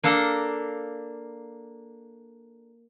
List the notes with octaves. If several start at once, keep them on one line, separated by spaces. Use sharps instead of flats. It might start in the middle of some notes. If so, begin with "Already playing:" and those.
A#3 D4 A4 F5 A#5